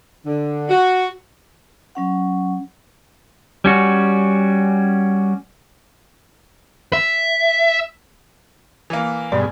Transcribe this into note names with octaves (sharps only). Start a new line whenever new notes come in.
D3
F#4
F#3 C#4 F#5
G3 C#4 F#4
E5
E3 A#3
G2 B2 G#3 D5